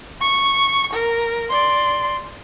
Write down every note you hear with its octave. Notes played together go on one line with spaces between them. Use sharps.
C#6
A#4
D5 C6